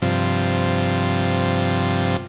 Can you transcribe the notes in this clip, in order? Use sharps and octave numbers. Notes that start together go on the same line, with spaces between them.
G2 C3 F3